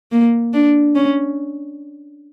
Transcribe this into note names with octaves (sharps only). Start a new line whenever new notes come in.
A#3
D4
C#4